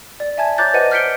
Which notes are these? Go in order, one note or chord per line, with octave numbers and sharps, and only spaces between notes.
D5
E5 G#5 A5 G#6
C#5 A#5 D6 F#6 G6 A6
B4 C5 D#5 F#5 D#7
F6 G6 B6 C#7 D7 G7